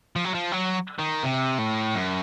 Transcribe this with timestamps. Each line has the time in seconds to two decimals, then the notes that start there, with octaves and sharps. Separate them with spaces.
0.16 F3
0.25 F#3
0.34 F3
0.52 F#3
0.99 D#3
1.23 C3
1.59 A2
1.95 F#2